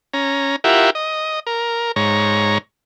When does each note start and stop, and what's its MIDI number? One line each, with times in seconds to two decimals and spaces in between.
0.14 0.56 61
0.14 0.56 82
0.64 0.90 64
0.64 0.90 65
0.64 0.90 67
0.64 0.90 70
0.64 0.90 76
0.64 0.90 78
0.95 1.40 75
1.47 1.92 70
1.96 2.58 44
1.96 2.58 73
1.96 2.58 82